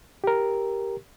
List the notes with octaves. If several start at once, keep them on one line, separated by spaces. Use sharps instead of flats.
G4 A#4